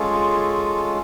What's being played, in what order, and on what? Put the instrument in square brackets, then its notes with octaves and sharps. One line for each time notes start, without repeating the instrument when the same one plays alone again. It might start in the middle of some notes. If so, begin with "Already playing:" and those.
Already playing: [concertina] G#3 C#4 F4 G#4 A4